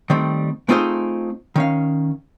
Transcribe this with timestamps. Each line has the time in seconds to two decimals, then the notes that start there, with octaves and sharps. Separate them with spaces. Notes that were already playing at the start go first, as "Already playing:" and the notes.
0.10 D#3 G3 A3 C4
0.69 A3 C4 D#4 F4 G#4 C5
1.56 D#3 C#4 F5